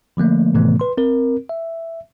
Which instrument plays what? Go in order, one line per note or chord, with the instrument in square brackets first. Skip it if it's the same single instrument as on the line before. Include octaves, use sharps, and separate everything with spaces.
[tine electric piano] D3 F3 A3 A#3
A2 C3 D#3 E3 A3 B3
B4 C6
C4 A#4
E5